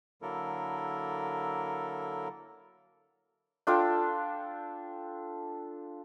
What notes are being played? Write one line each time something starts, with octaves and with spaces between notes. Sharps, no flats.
D3 F#3 A#3 E4 A4 A#4
D4 F4 A4 G5